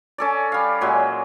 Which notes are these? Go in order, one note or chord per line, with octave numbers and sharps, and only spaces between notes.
C#4 A4 D5
G3 F5
A#2 F#3 G#3